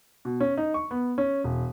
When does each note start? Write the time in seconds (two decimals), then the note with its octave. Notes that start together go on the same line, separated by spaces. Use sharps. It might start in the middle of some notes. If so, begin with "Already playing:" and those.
0.25 B2
0.40 C#4
0.58 D#4
0.74 C#6
0.91 B3
1.18 C#4
1.44 E1